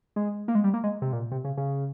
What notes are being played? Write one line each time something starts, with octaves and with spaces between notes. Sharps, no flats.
G#3
A#3
G#3
G3
A#3
G#3
C3
A#2
C3
C#3
C#3